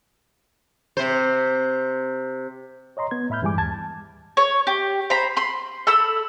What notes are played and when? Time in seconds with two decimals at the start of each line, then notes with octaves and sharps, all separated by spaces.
0.97 C3 C5
2.97 C#5 D#5 A#5 C6
3.11 B3 G#6
3.30 A2 E5 B5 F6 G6
3.42 G2 E3 G3 G#3 G#5 D6
3.57 D#2 A5 G#6
4.37 C#5
4.67 G4
5.10 C5 A#5 B5
5.37 B5 C6
5.87 A4 B5 E6